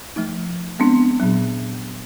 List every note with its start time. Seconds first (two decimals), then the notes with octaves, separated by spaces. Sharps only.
0.16 F3 A3 D#4
0.79 G#3 B3 C4 D4
1.20 A#2 F#3